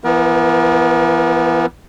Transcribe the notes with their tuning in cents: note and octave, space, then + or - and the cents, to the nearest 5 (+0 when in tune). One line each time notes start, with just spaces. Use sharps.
E3 +35 B3 +0 A#4 +35